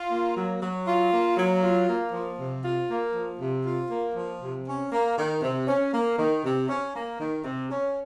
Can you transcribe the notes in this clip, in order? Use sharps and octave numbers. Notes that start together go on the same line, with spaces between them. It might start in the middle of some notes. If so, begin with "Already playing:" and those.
Already playing: F4
A#3
F#3
F#3
F4
A#3
F#3
F4
A#3
F3
C3
F4
A#3
F3
C3
F4
A#3
F3
C3
C#4
A#3
D#3
C3
C#4
A#3
D#3
C3
C#4
A#3
D#3
C3
C#4